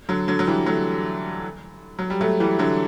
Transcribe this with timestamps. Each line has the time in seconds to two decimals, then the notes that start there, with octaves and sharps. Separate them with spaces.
0.09 D3 F#3
0.28 D3 F#3
0.39 F#3
0.47 E3 G3
0.66 F#3 A3
1.99 F#3
2.10 G3
2.21 F#3 A3
2.40 E3 G3
2.59 D3 F#3